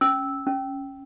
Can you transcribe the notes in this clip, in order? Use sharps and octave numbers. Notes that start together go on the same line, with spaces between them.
C#4 E6
C#4